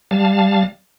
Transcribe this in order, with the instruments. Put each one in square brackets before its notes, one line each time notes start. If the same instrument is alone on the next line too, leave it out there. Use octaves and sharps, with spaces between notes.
[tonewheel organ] G3 F5 A5